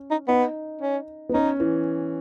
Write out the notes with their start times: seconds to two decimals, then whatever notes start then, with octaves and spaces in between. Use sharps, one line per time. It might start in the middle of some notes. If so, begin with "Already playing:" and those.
Already playing: C#4
0.11 D#4
0.28 B3 D#4
0.81 C#4
1.29 B3
1.34 C#4 D#4
1.60 E3